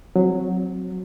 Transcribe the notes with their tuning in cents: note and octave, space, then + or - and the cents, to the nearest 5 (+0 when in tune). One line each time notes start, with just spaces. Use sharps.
F#3 -10 C4 +0